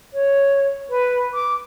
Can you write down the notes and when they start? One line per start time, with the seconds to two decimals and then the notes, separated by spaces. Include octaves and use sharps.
0.13 C#5
0.89 B4
1.34 D6